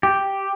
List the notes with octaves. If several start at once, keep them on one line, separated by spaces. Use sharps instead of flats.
G4